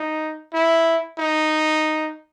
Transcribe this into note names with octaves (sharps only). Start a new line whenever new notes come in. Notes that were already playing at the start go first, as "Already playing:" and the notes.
Already playing: D#4
E4
D#4